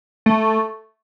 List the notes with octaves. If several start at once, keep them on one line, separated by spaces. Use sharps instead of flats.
A3